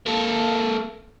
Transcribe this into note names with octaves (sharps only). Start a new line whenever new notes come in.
A#3 A4